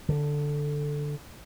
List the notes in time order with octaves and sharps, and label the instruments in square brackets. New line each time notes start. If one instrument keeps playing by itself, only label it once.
[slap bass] D3